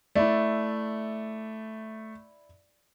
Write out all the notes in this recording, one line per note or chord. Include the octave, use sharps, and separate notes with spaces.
A3 E4 D5